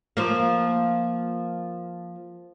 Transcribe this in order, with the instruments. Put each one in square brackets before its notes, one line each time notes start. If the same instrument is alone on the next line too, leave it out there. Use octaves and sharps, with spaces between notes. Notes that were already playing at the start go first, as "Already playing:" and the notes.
[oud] F3 A#3